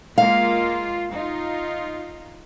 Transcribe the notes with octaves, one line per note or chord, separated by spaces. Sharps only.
G#3 A#3 F4 F5
D#4 F4